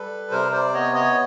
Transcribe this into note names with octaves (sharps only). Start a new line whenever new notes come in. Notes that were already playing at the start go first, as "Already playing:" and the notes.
Already playing: G3 A4 B4
C3 A#4 C5
C5 D5
B3 C#5 D#5
C#5 D#5